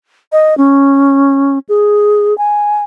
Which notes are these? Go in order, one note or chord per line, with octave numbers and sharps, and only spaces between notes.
D#5
C#4
G#4
G#5